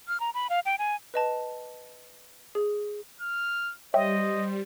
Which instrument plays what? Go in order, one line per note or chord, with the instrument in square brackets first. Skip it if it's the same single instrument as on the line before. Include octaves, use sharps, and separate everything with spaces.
[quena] F6
A#5
B5
F5
G5
G#5
[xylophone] B4 D#5 A5
G#4
[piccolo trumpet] F6
[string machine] G3 [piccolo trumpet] C5 [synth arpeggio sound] C#5 E5 G5 [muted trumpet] D#5